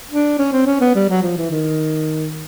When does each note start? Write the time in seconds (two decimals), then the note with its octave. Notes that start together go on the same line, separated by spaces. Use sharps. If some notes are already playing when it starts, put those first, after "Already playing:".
0.11 D4
0.39 C#4
0.52 C4
0.66 C#4
0.81 B3
0.95 G3
1.09 F#3
1.22 F3
1.37 E3
1.51 D#3